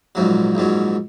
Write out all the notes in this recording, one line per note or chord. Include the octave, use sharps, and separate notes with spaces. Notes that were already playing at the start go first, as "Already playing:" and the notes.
A#1 G#2 F#3
A#1 G#2 F#3